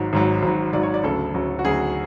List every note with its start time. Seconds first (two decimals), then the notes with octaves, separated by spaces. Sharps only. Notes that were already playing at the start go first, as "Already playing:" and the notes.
Already playing: G#1 G#2 F#3
0.13 G#1 G#2 F#3
0.43 G#1 G#2 F#3
0.73 G#1 G#2 F#3 D5
0.83 C#5
0.94 D5
1.03 D2 C#3 F#3 A4
1.34 D2 C#3 F#3
1.59 F#4
1.64 D2 C#3 F#3 G#4